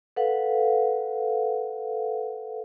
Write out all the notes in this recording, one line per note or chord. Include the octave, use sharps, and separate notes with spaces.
A4 B4 F5 F#5